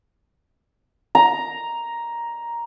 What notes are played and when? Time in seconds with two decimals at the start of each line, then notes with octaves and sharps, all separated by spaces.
1.15 A#5